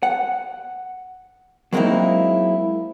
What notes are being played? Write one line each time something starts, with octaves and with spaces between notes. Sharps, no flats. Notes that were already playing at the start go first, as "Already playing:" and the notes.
F#5
F#3 G#3 A#3 C4 D#4 E4